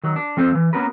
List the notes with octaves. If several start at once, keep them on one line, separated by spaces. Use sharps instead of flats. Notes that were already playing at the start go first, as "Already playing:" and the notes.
D#3 F#3
D4
F3 C4 A4 C5
E3
A#3 B3 C#4 F#4 A#4 B4